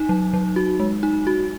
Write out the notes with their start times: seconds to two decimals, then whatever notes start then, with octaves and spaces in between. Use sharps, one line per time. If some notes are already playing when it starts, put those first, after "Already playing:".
Already playing: D#4
0.09 F#3
0.34 F#3
0.56 F#4
0.80 G#3
1.03 D#4
1.27 F#4